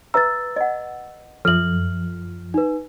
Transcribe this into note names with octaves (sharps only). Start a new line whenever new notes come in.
B4 E5 A#5 E6 A6
D#5 F#5
F#2 F3 A4 E5 F6 F#7
D#4 B4